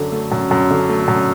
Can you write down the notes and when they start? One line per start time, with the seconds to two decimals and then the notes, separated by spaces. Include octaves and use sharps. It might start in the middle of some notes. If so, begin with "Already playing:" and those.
Already playing: F#2 D3
0.12 A3
0.32 F#2
0.51 F#2
0.71 D3
0.89 A3
1.08 F#2